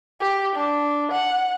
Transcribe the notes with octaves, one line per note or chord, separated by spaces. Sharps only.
G4
D4
F#5